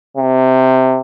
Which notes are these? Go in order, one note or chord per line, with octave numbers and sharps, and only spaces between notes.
C3